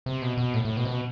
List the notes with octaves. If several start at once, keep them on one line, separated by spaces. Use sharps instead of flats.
C3
B2
B2
A2
A2
B2
C3
B2